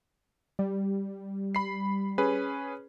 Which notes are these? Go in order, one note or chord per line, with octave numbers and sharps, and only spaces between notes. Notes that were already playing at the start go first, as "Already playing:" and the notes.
G3
B5 C7
C#4 G#4 B4